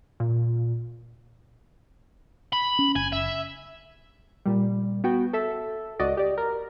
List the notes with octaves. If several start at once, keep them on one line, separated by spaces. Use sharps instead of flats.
A#2
B5
C#4
F#1 G#5
E5
A#2 G3
B3 F#4 G5
A4 E5
C#2 F#4 D5 D#5
G4 D5
A#4